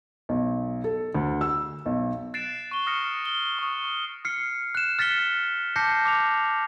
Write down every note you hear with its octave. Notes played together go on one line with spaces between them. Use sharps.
B1
A4
D2
E6
B1
F#6 A6 C7 D7 E7
C#6 G7
D#6 F6 A#6 C#7
G7
C#6 D#6
F6 C7 C#7
F#6 E7
F6 A6 B6 C#7 G7
A5 D6 G6 A#6 C7 C#7
D6 F7